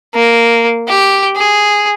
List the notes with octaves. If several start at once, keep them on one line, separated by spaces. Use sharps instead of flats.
A#3
G4
G#4